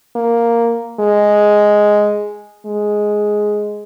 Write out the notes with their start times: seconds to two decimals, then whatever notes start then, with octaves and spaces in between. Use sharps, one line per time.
0.16 A#3
1.00 G#3
2.66 G#3